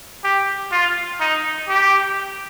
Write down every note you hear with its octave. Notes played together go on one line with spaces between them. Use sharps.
G4
F4
D#4
G4